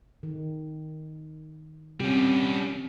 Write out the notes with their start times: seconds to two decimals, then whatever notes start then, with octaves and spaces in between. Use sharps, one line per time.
0.23 D#3
2.00 C3 G3 C#4